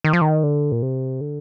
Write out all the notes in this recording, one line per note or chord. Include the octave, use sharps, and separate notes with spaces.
D#3
F3
D#3
D3
A#2
C3
D3